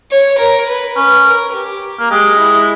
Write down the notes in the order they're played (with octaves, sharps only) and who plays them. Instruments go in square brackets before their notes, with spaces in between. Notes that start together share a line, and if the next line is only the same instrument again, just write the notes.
[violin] C#5
A#4
B4
[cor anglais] C#4 [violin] B4
[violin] A#4
G4
[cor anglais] A#3
[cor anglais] G#3 [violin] G4
[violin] E4